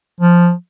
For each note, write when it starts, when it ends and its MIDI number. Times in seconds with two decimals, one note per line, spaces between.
0.21 0.52 53